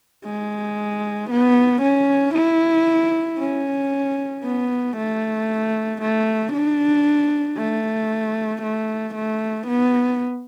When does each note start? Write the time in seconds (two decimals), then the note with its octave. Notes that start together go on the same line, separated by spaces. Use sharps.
0.25 G#3
1.30 B3
1.82 C#4
2.35 E4
3.39 C#4
4.43 B3
4.97 A3
6.01 A3
6.53 D4
7.57 A3
8.63 A3
9.15 A3
9.68 B3